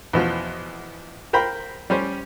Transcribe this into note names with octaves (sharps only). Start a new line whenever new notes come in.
E2 B2 F3
A#4 C5 G5 B5
G3 C#4 C5